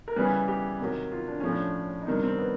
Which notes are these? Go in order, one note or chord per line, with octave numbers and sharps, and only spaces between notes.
A#4
C#3 E3 G3 B4
G4
C3 D#3 F#3
F4
D4
A2 F3 C#4
D4
D#4
C3 D#3 G3 D4
C4
B3